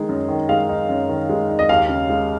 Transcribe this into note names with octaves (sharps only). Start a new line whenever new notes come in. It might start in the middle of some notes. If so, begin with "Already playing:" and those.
Already playing: D#3 G#3 D#4
F#2
D#3
G#3 F5
D#4
F#2
D#3
G#3
D#4
D#5
D#2 F5
C#3
G#3